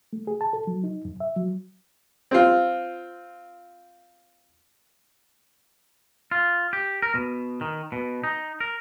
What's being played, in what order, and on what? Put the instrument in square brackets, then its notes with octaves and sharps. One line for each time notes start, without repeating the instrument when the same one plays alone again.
[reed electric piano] A3
G#4
A5
A4
F#3
D#4
F#2
E5
F#3
[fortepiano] C4 F4
[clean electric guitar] F4
G4
A#4
B2
D#3
B2
D#4
A#4